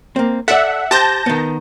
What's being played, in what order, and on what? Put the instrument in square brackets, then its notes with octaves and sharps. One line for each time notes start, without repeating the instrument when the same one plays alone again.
[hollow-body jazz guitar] A#3 C4
[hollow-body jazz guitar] A4 D5 [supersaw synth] E5 F#5
[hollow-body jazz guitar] G4 C5 [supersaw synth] A5 G6 A#6
[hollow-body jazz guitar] D#3 B3